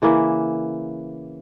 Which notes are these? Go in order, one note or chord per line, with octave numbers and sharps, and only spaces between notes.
C#3 E3 A#3 E4